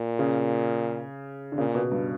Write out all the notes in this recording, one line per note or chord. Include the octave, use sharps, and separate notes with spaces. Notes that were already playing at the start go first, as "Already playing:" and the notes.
Already playing: A#2
C#3
D3
A#2 C#3
B2
G2